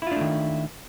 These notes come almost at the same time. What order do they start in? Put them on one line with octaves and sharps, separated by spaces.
E4 F4 D4 A3 D#3